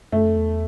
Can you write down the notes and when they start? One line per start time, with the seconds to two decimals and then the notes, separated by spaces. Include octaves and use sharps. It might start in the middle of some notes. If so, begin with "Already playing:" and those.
0.12 F#2 A3
0.24 F2
0.37 E2